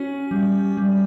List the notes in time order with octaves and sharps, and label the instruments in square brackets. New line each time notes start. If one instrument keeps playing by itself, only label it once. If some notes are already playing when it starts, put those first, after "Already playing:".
Already playing: [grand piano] C#4 [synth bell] F#4
[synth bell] G3
G3